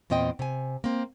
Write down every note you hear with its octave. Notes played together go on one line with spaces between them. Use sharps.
E2 A#2 C4 D#5 G5
C3 G#5
A#3 C4